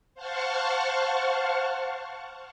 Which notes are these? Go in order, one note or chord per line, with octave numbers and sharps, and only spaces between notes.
C5 F5 F#5 A5 C#6 F6